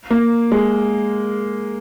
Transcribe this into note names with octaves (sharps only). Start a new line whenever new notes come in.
A#3
G#3